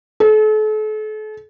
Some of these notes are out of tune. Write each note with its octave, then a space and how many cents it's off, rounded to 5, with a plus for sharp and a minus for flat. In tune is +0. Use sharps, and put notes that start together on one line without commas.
A4 -40